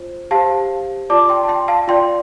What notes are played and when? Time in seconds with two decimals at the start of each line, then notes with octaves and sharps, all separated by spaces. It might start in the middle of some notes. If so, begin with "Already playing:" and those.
Already playing: F4 C5
0.31 G4 C5 F5 A5
1.10 F4 D5 A5 D6
1.29 G5 C6
1.43 A5
1.48 G5 C6
1.68 F5 A5
1.88 F4 D5 G5 C6